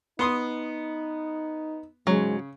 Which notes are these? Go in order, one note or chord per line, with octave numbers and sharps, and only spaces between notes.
B3 D#4 C6 D#6
G#2 C#3 F#3 G#3